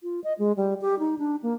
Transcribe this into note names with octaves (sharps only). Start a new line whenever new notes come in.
F4
D#5
G#3
G3
G4
D#4
D4
A#3